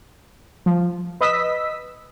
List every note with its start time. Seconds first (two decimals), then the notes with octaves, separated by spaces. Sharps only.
0.66 F3
1.21 B4 D#5 D#6 E6 B6